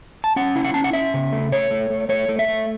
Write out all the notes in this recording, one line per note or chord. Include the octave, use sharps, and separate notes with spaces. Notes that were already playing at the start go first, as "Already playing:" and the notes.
A5
C#4 F#5
E4
F#5
C#4 A5
F#5
C#4 E5
C#3
A3
A3 C#5
A3
A3
A3 C#5
A3
E5
A3